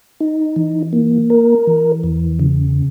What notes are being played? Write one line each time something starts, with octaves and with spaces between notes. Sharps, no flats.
D#4
E3
A#3
A#4
E3
E2
C#3